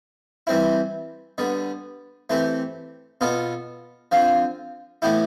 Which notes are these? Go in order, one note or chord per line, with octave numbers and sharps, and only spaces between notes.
E3 G3 C4 E4
D3 G3 B3
E3 A3 C4 G4
B2 B3 F4 A4
D3 F3 C4 F4
A2 E3 B3 E4 G4